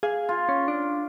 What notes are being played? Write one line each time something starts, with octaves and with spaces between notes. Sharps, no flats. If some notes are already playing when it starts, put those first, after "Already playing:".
G#4 F5
F4
C#4
D4